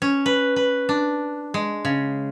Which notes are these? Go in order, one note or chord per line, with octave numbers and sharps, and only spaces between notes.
C#4
B4
B4
D4
G#3
C#3